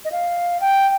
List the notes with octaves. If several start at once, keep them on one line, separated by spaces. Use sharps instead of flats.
D#5
F5
G5